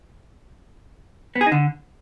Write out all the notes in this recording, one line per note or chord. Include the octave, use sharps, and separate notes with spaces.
B3
G#4
D#4
D3